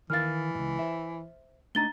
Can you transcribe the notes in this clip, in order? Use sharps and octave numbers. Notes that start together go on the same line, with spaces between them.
D#3 E3 A#4 F5 F6 A6
C#2 F#2
C5 E5
A3 D4 D#4 A#5 A6 G7